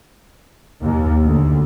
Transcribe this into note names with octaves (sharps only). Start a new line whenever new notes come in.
D#2
D2